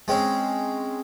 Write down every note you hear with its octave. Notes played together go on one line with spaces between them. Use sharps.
G#3 C4 C#4